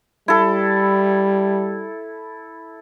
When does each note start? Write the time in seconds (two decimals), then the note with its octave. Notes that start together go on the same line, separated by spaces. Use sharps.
0.28 G3 E4 A4